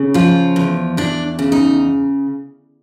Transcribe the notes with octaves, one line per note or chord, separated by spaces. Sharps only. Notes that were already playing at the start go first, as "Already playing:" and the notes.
Already playing: C#3
F3 F4
E2
E2 D4
C#3
D#4